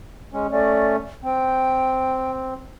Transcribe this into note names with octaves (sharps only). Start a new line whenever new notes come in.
G#3 C#4
A3 C#4 D5
C4 G5